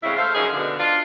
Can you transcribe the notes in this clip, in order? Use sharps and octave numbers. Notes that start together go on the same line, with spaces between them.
A2 C#3 G#3 C4 E4
A3 A4 C5 F5
F#2 C#3 F3 D#4 G#4
B2 D3
D4 F4